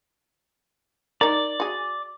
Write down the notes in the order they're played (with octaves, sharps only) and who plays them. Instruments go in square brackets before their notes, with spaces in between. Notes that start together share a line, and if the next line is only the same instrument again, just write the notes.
[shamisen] D#4 A#4 [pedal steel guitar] D5
[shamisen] F#4 G#4